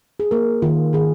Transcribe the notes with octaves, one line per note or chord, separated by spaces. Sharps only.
G#4
A#3 A#4
D#3 F4
D#3 G#4